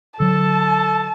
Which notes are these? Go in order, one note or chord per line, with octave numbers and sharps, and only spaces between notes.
D3 F#3 A4 A5